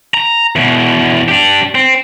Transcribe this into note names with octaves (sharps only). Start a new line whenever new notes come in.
A#5
E2 B2
D4 G4
C4